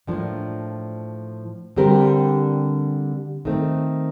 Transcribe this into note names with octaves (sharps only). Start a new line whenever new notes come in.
A2 F3 A#3 D4
D3 G3 C4 G4 A#4
D#3 A3 C4